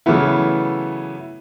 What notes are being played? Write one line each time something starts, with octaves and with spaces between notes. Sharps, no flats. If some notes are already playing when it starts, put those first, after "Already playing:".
C#3 E3 F#3 A3 B3 E4